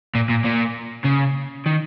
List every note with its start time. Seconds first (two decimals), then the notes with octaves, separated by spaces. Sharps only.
0.15 A#2
0.30 A#2
0.45 A#2
1.05 C#3
1.66 D#3